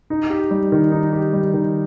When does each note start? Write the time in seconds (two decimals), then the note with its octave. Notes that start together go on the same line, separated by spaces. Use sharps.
0.10 D#4
0.30 G4
0.51 G3
0.72 D#3
0.92 D#4
1.12 G4
1.33 G3
1.54 D#3